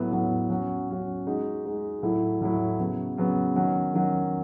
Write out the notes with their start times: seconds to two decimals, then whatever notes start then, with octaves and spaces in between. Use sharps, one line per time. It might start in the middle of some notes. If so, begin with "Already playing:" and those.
Already playing: A2 F#3 B3
0.12 A2 F#3 B3
0.50 F#3 C#4 F#4
0.89 F#3 C#4 F#4
1.27 G#3 D#4 F#4
1.65 G#3 D#4 F#4
2.03 A2 F#3 A3 E4
2.41 A2 F#3 A3 E4
2.79 C#3 F#3 B3
3.17 C#3 F#3 B3
3.56 D#3 F#3 C#4 F#4
3.94 D#3 F#3 C#4 F#4